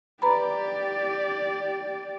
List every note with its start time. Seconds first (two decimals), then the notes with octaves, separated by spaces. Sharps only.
0.22 G4 B4 D5 A#5 B5